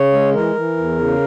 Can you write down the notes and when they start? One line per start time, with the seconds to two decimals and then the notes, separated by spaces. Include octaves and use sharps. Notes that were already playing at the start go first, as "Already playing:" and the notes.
Already playing: C#3 C#5
0.13 G#3
0.34 E3 A#4
0.55 E3
0.77 E2
0.98 C#3